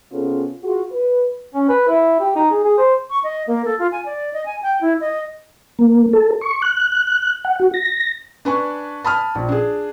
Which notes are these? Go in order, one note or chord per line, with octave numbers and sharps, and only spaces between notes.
C3 B3 C#4 F4 G#4 A4
F4 F#4 G#4
B4
C#4
B4
E4
G4
D#4
G#4
G#4
C5
C#6
D#5
A#3
A4
F4
G#5
D5
D#5
G#5
G5
E4
D#5
A#3
A4
C#6
F#6
F#5
F#4
A#6
D4 B4 G#5 C#6
A5 B5 D#6 F6
A#1
D4 G#4